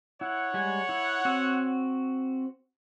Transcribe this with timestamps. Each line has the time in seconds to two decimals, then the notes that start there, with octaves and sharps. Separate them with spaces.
0.21 E4 C#5 F#5
0.54 G3 G#3 G#5
0.89 E4
1.25 C4 F#4 E6